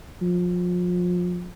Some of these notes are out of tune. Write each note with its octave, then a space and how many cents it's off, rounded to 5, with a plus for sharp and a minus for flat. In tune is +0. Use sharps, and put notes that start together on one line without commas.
F3 +30